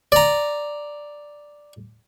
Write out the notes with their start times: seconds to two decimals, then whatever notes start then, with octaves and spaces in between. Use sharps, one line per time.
0.12 D5 A#5